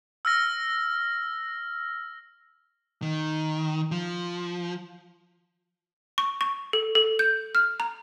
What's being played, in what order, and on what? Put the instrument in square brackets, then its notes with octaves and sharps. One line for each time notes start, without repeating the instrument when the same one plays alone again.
[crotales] E6 F6 A#6
[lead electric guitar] D#3
F3
[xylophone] C#6
C#6
A4
A4
G6
F6
A#5